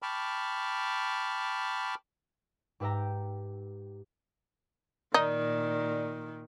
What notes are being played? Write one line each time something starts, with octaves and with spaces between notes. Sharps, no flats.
G5 A5 B5 C#6 D6 F6
G#2 G4 B4 E5 G5 A#5
A#2 D#3 D#4 D5